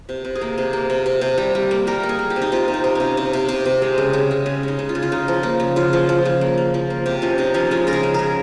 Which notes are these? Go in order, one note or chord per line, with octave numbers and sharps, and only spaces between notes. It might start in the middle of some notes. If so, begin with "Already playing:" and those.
C3
C3
G#4
A#3
C3
A#3
C3
C3
C3
G3
G3
A#3
G3 A#4
A#3
G#4
A#3
G4
C3
D#4
C3 F4
C3
D#4
C3
C3 C#4
C3
C3
C3
C3
G#3
C#3
C#3
G#3
C#3 C#4
G#3 D#4
C#3
F4
C#3
F4
C#3 D#4
F3
A#3
C#3
C#3 F4
F3
F3
C#3
A#3
A#3
F3
A#3
C3 G4
F3 C#4
C3 D#4
F3 C#4
G#3 F4
C#3 A#4
G#4
C#3
C#3 A#4